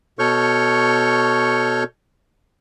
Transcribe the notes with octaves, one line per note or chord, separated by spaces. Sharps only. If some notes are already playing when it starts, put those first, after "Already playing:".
B2 A4 C#5 C#6 F6 G6